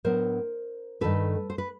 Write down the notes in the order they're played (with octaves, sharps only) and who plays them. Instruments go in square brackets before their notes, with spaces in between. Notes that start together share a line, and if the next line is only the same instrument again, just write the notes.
[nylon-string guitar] A2 F#3 B3 D4 A#4 C5
G2 D#3 F#3 A3 A4 B4
C5
B4